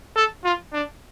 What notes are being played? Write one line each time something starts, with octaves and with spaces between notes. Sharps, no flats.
A4
F4
D4